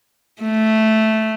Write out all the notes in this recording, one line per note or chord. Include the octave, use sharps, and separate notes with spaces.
A3